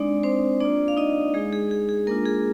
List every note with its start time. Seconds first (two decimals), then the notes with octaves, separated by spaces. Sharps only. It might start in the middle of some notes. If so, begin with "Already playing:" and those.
Already playing: G#3 C4 D4 D#4 D5
0.23 C4 C5
0.60 A#3 D4 F4 D5
0.88 F5
0.97 D#4 D#5
1.34 G#3 D#4 G#4
1.53 G#4
1.71 G#4
1.89 G#4
2.07 G#3 A#3 D4 F4 A#4
2.26 G#4